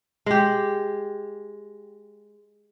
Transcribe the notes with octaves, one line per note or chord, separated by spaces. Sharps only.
G#3 G4